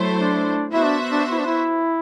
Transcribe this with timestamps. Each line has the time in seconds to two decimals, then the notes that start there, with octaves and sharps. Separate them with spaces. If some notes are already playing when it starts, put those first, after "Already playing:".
Already playing: F#3 A3 E4 A4 C5
0.18 D4
0.71 B3 E4 F#4 C5 E5
0.85 D4
1.11 D4
1.32 E4
1.39 D4
1.46 E4